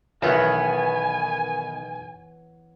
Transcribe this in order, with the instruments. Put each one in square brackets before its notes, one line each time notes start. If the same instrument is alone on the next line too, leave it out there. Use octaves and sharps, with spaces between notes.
[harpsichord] B1 E4 [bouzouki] D#3 B3 [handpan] E3 C#5 F#5 [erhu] G#5